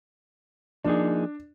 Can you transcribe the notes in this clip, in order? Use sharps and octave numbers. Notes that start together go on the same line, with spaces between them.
F3 A#3 D4 D#4 G#4